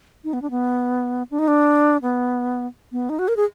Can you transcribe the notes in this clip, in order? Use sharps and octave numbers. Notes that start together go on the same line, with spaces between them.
D#4
B3
D4
B3
D4
D#4
D4
B3
B3
D#4
F#4
A#4
G#4